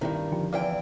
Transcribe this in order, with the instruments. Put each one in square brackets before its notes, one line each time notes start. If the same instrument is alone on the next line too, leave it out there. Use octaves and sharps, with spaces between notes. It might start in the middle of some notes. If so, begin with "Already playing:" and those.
[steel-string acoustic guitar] G2 D#3 [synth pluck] C4 E4 G4
[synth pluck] D3 F3 G4
[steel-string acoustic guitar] E2 E3 G5 [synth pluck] D5 F5